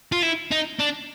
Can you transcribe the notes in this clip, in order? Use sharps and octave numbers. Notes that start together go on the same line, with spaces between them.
F4
E4
D#4
D4